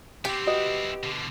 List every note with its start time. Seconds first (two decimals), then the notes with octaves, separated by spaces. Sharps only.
0.25 B3 C4 G4 G5
0.47 C4 E4 F#4 B4 D#5
1.03 B2 D3